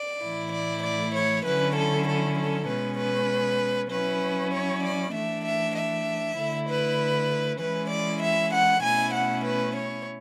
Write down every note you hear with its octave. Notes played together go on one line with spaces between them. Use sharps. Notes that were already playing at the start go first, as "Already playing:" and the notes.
Already playing: D5
A2 E3 A3 E4
D5
D5
C#5
D3 F#3 C#4 E4 B4
A4
A4
A4
B2 G#3 C#4 B4
B4
F#3 C#4 E4 B4
C#5
D5
E3 A3 D4 E5
E5
E5
D3 A3 E4
B4
E3 G#3 C#4 E4 B4
D5
E5
F#5
B2 A3 C#4 E4 G#5
F#5
B4
C#5